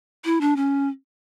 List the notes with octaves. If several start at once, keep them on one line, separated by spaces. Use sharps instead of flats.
E4
D4
C#4